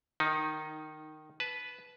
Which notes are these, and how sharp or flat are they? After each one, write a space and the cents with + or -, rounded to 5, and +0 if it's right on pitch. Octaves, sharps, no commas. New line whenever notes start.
D#3 -10 D#4 +10
B4 +0 A5 -30